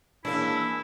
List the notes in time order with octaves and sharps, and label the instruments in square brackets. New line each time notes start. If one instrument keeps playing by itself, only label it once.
[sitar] E3 G#3 C#4 [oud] A#3 D4 [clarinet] E4 [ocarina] E6